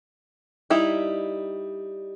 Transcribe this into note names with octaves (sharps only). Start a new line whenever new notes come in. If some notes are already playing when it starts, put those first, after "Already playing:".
G3 D#4 E4